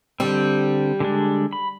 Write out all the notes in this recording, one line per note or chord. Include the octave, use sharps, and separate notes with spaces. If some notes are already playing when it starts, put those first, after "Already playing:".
D3 G3 C4
D3 G#3 D4
B5